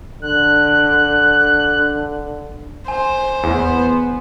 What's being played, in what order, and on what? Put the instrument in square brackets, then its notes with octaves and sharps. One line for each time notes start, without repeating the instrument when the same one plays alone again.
[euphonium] D3 [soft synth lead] F#6
[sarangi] C5 [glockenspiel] G#5
[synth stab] E2 [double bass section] B3